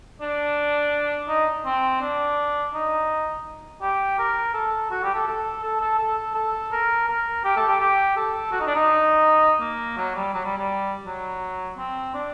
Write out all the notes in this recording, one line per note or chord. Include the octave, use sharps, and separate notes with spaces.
D4
D#4
C4
D4
D#4
G4
A#4
A4
F#4
G4
A4
A4
A4
A4
A4
A4
A#4
A#4
G4
A4
G4
G4
A4
F#4
D#4
D4
D#4
A#3
F#3
G3
F#3
G3
G3
F#3
C4
D4